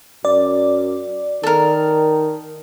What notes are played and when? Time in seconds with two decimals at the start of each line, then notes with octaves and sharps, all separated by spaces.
0.25 F#2 D5
1.43 D#3 A4 A#4